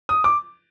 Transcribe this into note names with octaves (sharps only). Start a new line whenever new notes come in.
D#6
D6